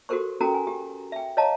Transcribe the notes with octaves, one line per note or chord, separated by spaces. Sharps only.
F#4 G4 A4 A#4 C5 C#6
C#4 F#4 A4 A#4 G5 A#5
G#5
G4
E5 G5
C#5 D#5 F5 A5 A#5